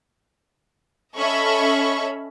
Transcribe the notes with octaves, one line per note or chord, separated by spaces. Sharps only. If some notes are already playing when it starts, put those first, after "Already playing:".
C#4 A4 D#5 E5 B5 C#6